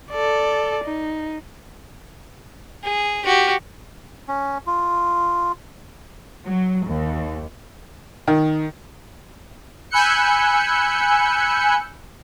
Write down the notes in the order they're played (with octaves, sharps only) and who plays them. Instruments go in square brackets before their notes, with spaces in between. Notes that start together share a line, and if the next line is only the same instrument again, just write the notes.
[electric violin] A4 D5
D#4
[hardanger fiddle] G#4
F#4 G4
[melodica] C#4
F4
[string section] F#3
D#2
[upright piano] D#3
[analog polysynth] G#5 B5 E6 F#6 G6 C#7